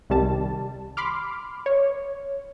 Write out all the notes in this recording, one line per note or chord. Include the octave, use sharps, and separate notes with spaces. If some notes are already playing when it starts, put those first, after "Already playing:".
C2 D#3 G3 A5
B5 C6 D6 F6
C#5